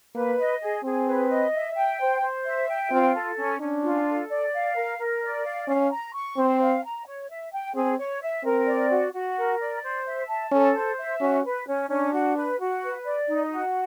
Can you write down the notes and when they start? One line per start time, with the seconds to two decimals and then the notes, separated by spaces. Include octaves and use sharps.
0.15 A#3 B4
0.39 D#5
0.61 G#4
0.84 C4 G#4
1.06 B4
1.30 D#5
1.54 E5
1.76 G5
2.00 C5
2.22 C5
2.45 E5
2.69 G5
2.91 C4 F4
3.15 A4
3.38 C#4
3.60 C#4 D4
3.84 F4
4.06 A4
4.30 D5
4.53 F5
4.76 A#4
4.99 A#4
5.22 D5
5.45 F5
5.68 C#4 F5
5.91 A#5
6.14 C#6
6.36 C4 C5
6.61 F5
6.84 A#5
7.06 C#5
7.29 E5
7.52 G5
7.75 C4 G#4
7.98 C#5
8.22 E5
8.44 C4 A#4
8.67 D5
8.90 F#4
9.13 F#4
9.37 A#4
9.60 D5
9.83 C5
10.06 E5
10.28 A5
10.52 C#4 A4
10.74 C5
10.98 E5
11.20 C#4 F#4
11.44 B4
11.68 C#4
11.89 C#4 D4
12.12 F#4
12.36 B4
12.60 F#4
12.83 B4
13.05 D5
13.28 D#4
13.51 F#4